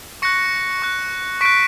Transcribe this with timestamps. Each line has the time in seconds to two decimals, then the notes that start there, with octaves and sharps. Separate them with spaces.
0.22 C#6 F#6 A#6 C#7
0.82 C#6 F#6
1.41 C#6 F#6 B6 D7